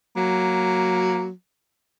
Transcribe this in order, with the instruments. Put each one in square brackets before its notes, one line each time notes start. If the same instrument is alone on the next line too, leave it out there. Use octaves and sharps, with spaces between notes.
[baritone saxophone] F#3 [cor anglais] A#3